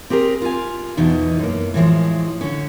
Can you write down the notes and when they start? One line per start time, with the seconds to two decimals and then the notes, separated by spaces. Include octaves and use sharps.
0.10 C4 G4 G#4 A#4
0.42 F4 G#5
0.97 E2 B2 E3 D#4
1.39 F#2 A#3
1.74 A2 E3 F3 G#3
2.41 D3 C#4